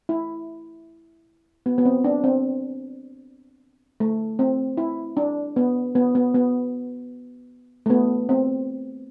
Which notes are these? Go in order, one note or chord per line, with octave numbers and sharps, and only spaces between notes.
E4
B3
B3
C4
D4
C4
A3
C4
E4
D4
B3
B3
B3
B3
A3
B3
C4